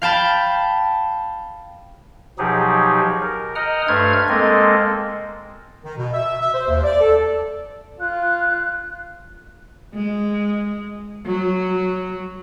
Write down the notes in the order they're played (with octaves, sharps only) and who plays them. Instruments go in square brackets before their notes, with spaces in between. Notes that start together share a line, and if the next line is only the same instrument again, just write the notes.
[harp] F5 G5 A5 B5
[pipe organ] B2 F3 F#3 D#4 G4 G#4
A#4
D#5 F#5 G5 A#5 D#6 F6
G2 A3 B4 C5 F6 G#6
G#3 A#3 C4 A4 A#4 D#5
[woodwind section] D#3
B2
E5
E5
C5
D#2
D5
A4
[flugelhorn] F4 [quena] F#6
[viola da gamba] G#3
F#3